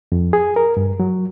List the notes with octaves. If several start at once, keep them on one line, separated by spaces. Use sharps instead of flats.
F2
G#4
A#4
G2
F#3